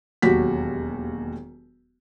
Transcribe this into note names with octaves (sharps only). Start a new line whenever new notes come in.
E1 D#2 F#3 F#4 G4 B6